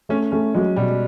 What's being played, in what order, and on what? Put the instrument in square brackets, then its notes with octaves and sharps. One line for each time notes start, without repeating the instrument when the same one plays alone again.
[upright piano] A3 [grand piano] C#4
[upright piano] A3 [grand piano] C#4
[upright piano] F#3 [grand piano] G#3
[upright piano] B2 [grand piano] G3